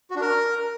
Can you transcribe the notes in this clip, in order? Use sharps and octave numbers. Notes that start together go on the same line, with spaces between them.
F#4
D4
A#4